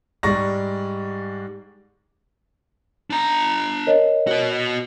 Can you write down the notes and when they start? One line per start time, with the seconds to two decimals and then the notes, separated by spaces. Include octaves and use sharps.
0.23 G#2 G3 G#3 D5 C#6 A#6
3.10 D4 A#5
3.87 A#4 C#5 D#5
4.27 F#4 B4